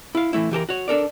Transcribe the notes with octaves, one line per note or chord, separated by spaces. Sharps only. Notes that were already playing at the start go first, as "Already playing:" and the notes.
E4 F5
E3 A3 E4
E3 G4 A4 A#4
F#4 C#5
D4 A4 A#4 D5